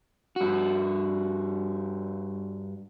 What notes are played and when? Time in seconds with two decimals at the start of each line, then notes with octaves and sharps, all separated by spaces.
0.36 G2 F#4